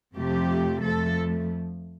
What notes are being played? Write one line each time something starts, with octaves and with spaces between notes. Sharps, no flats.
F2 C3 F3 A3 G4
F2 F3 A3 A4